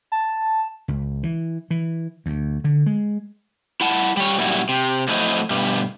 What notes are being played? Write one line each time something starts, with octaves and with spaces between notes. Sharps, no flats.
A5
C#2
E3
E3
D2
D3
G#3
E4 F#5 A5
G3 C#5
F#2 A#2 G3 E4 F#4
C3
F2 F#3 A3 E4 C5 D#5
G2 B2 G3